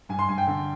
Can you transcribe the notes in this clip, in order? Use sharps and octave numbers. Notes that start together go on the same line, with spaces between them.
G2 G#5
C6
G2 G#5
G5
D3